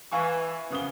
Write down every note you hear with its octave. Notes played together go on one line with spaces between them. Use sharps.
E3 F5 G#5 C#6
F#2 C#3 F3 B3 D#6 G7